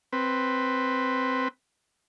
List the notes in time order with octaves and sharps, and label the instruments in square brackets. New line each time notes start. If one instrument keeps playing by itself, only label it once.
[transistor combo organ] C4 B4